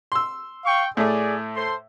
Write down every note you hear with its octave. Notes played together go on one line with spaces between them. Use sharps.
C6 E6
F5 G5 C#6
A2 A3 G#4 D5
A4 C5 C6